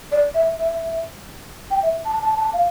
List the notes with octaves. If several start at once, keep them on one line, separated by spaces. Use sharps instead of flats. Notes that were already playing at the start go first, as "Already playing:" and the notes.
D5
E5
E5
G5
E5
A5
A5
A5
F5